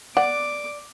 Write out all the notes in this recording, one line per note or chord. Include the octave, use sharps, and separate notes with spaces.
D5 F#5 D6